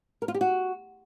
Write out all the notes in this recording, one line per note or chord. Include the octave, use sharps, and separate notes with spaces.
A#4
F4
G4
F#4